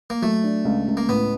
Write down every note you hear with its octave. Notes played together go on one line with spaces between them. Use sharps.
A#3
F#3 A3
D4
C#2
C#2
A#3
A2 B3